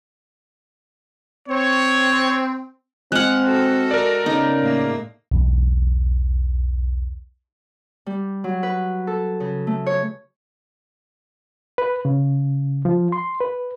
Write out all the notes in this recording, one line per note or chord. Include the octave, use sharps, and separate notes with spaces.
C4 C#5
G#3 C4 F#5 F6 F#6
F#4 A4
A#4 D5
C#3 B3 D#4
A2 A#3
B1 E2
G3
F#3
B4
A4
C#3
A3
C#5
B4
C#3
F3
C6
B4